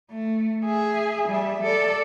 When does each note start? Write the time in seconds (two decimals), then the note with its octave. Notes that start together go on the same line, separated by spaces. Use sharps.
0.10 A3
0.65 G#4 E5
1.28 G3 E5
1.62 A4 D5